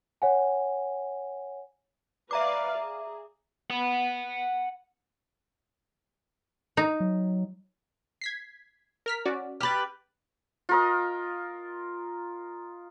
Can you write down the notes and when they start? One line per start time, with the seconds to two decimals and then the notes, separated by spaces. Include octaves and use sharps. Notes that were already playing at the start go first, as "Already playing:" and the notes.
0.22 C#5 F#5 G#5
2.31 B4 D5 E5 F5 A#5 D6
2.78 G#4
3.70 F#5 B5
6.77 D#4
7.00 F#3
8.21 G#6 B6 C7
9.06 A#4 F6 B6
9.25 C#4 F#4 D5
9.61 G4 B4 F6 A6
10.69 F4 A#4 D#5